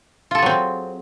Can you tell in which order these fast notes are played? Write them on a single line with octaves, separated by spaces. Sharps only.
F4 A4 G#4 F#3 C4